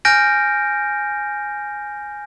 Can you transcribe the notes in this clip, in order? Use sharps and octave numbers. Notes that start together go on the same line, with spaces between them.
G#5 F6 G6 A#6 D7